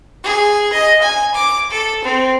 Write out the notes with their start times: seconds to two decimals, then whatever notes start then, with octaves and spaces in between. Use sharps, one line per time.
0.24 G#4
0.73 D#5
1.02 G#5
1.35 D6
1.71 A4
2.04 C4